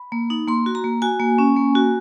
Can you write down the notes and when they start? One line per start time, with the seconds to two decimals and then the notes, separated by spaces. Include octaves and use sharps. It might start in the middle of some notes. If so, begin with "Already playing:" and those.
Already playing: B5
0.12 A#3
0.30 D#4
0.47 A#3 C6
0.66 F#4
0.75 A#5
0.84 A#3
1.02 F#4 G#5
1.20 A#3
1.38 C#4
1.56 A#3
1.75 F#4